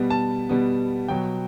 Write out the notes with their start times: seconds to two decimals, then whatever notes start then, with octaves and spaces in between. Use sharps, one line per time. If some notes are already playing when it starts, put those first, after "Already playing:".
Already playing: B2 G3 B3
0.10 A5
0.49 B2 G3 B3
1.08 B2 F#3 B3 G5